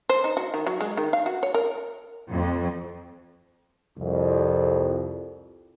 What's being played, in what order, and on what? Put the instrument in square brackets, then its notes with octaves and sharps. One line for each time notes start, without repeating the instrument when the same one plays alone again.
[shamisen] C5
D#4
F#4
D#3
F#3
G#3
D#3
F5
F#4
C#5
A#4
[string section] F2
[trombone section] C2 F2